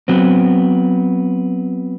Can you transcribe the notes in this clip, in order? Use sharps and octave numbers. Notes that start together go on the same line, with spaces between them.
F#3 B3 C4